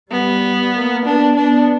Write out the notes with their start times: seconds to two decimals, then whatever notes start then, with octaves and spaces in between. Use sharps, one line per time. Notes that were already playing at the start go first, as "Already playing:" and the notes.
0.11 G3 B3
0.74 A#3
1.05 B3 D4
1.37 B3 D4